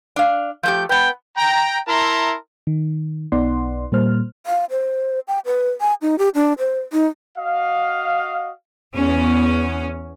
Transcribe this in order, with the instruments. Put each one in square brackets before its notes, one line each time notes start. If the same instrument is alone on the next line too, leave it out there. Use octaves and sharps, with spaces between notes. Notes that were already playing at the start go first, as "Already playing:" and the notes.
[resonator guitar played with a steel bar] D4 F5
[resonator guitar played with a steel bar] F3 A3 G4 [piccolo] G6
[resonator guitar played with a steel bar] B3 B4 [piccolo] G5
[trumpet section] G5 A#5
E4 A#4 E5 A5 A#5 C6
[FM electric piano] D#3
B1 B3 D#4 D5 F#5 C6
A#2 G3 A#3 C5 F6
[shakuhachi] F5
C5
G5
B4
G#5
D#4
G4
D4
C5
D#4
[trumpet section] F#4 D#5 F5
[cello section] E2 C#4